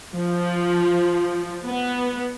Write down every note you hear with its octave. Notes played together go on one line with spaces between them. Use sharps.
F3
B3